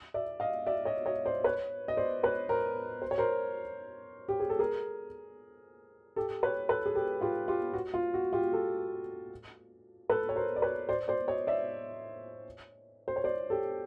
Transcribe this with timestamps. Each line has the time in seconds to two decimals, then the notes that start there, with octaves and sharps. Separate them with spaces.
0.14 D5 E5
0.40 D#5 F5
0.67 D5 E5
0.85 C#5 D#5
1.06 C#5 D#5
1.25 C5 D5
1.44 B4 C#5
1.88 D#5
1.97 C5 D5
2.23 B4 C#5
2.49 A#4 C5
3.02 C5
3.11 C#5
3.18 A#4 C5
4.29 G4
4.40 G#4
4.50 A4
4.59 G#4 A#4
6.16 G4 A4
6.43 B4 C#5
6.69 A4 B4
6.86 G#4
6.95 G4 A4
7.21 F4 G4
7.48 F4 G4
7.74 F#4
7.94 F4
8.14 F#4
8.33 F4 G4
8.52 G4 A4
10.10 A4 B4
10.29 C#5
10.36 A#4 C5
10.56 D5
10.62 B4 C#5
10.89 C5 D5
11.08 C5 D5
11.28 C#5 D#5
11.47 D5 E5
13.08 C5
13.16 C#5
13.24 C5 D5
13.50 G4 A4